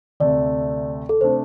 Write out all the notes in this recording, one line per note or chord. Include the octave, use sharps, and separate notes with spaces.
D2 C3 A3 D5
A4
C3 A3 D4 C5